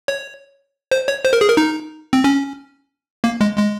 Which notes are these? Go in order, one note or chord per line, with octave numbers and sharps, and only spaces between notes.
C#5
C5
C#5
C5
A#4
G#4
A#4
D#4
C4
C#4
A#3
G#3
G#3